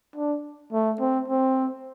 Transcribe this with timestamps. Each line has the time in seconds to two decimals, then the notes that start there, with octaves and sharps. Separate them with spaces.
0.16 D4
0.72 A3
1.00 C4
1.28 C4